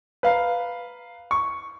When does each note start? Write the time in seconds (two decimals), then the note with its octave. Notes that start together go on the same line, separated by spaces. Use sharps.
0.23 B4 F5 A#5
1.31 C#6